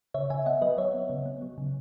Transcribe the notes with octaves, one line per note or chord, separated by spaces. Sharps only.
C#3 C#5 E5
C#3 E5 G#5
B3 D#5 F#5
F#3 B4 D#5
F#3 C#5 E5
B3
C#3
B3
F#3
C#3